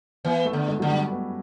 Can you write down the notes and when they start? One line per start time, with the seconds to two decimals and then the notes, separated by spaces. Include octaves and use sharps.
0.25 E3 B3
0.45 A3
0.53 D3
0.68 G#3
0.80 D3 F#3
0.90 G3
1.12 B3